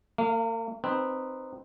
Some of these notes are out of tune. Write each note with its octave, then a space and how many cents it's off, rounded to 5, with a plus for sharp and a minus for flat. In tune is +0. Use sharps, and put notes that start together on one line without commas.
A#3 -40 F5 +0
C4 +0 D#4 -15 B4 +0